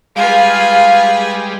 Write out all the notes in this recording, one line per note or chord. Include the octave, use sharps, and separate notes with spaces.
G3 G#3 F4 G#4 B4 F5